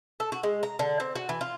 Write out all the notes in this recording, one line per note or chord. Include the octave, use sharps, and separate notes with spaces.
A4
F#4
G#3
A#5
D3
C4
F#4
E3
F4